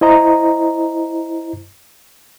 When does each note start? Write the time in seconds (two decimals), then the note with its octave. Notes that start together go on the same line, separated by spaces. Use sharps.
0.01 E4 C5 D#5 A#5